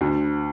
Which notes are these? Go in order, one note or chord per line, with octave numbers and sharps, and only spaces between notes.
D2